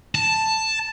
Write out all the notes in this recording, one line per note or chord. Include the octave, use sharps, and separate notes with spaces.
A5